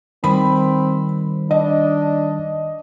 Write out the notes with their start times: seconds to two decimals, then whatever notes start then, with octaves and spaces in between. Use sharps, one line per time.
0.24 D#3 G3 C4 B5
1.51 D4 D#5